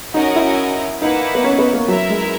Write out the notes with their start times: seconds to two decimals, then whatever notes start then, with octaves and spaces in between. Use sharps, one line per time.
0.14 C#4 D#4 F#4 A#4 D#5
0.36 E4
1.01 A#3 D#4 E4 B4 F#5
1.35 B3
1.44 C#4
1.59 B3
1.73 A#3
1.88 F#3 E4 A#4 E5
2.10 G#3